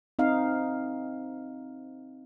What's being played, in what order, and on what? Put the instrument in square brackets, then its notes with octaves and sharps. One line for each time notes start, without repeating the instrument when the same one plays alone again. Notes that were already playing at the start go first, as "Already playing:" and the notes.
[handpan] C4 D#4 F5